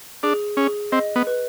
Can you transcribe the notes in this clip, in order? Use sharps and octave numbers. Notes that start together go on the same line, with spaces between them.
D4 G#4
C#4 G#4
C4 D#5
B3
B4